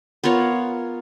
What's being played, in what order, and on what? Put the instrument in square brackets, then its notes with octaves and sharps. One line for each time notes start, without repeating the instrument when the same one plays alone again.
[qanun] B3 F4 A#4 C#5